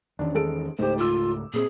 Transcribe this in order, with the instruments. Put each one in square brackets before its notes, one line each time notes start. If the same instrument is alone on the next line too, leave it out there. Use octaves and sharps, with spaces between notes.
[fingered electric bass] E2 D#3 C#4 [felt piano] D4
[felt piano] G#3 A4 D7
[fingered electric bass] C#2 G#2 A3 [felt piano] D#4 G4 [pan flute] C5
[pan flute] F4 [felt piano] D6 E6
[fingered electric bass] A#2 B3 C4 [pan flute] G#4